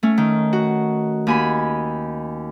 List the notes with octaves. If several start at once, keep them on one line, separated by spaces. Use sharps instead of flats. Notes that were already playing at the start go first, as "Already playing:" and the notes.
A3 C#4
D#3
F#4
D#2 G#5 B5